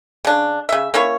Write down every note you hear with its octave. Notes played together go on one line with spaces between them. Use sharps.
C#3 D4
C#3 E5
A#3 C#4 E4 C#5